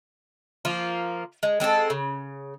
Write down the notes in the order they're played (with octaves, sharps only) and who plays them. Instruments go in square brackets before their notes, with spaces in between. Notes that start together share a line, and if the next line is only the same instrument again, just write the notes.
[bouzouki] F3 A#3 F4
G#3
G#3 C4 G4 A4
C#3